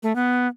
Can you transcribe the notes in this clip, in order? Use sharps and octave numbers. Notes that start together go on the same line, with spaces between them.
A3
B3